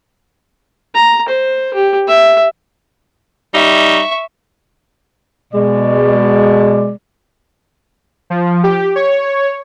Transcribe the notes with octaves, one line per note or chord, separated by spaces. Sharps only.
A#5
C5
G4
E5
G3 D#4 E5 C#6
B2 G#3 D5
F3
G4
C#5